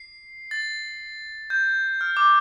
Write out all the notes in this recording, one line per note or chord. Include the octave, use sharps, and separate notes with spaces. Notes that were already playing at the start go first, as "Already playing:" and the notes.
Already playing: C7
A6
G6
F6
D6